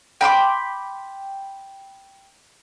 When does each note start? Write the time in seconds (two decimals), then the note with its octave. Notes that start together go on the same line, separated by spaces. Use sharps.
0.21 G5 B5 C6 D6